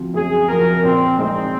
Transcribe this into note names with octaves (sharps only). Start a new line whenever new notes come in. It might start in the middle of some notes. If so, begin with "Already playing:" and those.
Already playing: F3 C4 F#4
F#2 G#4
F3 C4 F#4 A#4
A#2 C4
G#3 C4 D#4